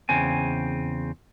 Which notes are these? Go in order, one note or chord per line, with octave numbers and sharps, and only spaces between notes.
E2 C#3 C4 G#5